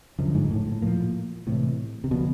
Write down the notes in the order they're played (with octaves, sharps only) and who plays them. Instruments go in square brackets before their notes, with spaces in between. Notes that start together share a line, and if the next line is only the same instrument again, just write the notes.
[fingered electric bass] F#2 [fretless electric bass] D3 F3 G#3
[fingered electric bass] G#2
A2
A2
[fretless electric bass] A#2 F3 A#3
[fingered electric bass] A2 [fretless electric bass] C3 E3 G#3
[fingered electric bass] C3
[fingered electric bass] B2 [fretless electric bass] D3 F3 A#3 D4